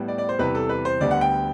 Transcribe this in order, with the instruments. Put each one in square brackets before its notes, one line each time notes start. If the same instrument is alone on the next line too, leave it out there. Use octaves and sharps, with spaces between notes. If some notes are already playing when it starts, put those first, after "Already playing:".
Already playing: [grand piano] A2 G3 B3
D5
D5
C5
E2 C3 E3 G3 B4
A4
B4
C5
D2 D3 G3 B3 D5
F#5
G5